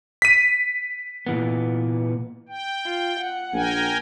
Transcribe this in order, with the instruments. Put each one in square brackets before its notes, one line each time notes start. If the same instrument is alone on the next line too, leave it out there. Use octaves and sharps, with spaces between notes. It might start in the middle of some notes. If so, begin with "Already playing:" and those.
[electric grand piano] B6 D#7
[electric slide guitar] A#2 E3 B3
[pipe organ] G5
[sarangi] F4
F#5
[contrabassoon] A#1 [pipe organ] A#4 G5 G#5